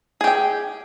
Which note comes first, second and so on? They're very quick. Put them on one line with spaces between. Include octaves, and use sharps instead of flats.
G#4 G4 G5